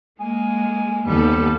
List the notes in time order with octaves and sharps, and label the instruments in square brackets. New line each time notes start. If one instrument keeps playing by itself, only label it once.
[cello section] G#3 A#3 [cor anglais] G#5
[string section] D#2 [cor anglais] G3 [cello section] B3 C4 A4